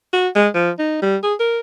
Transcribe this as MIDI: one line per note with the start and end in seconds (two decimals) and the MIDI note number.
0.13 0.28 66
0.36 0.48 56
0.55 0.70 53
0.79 0.98 63
1.02 1.17 55
1.23 1.34 68
1.40 1.60 70